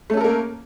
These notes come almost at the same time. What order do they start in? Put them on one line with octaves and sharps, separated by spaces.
A3 C#4 A4 A#4 A#3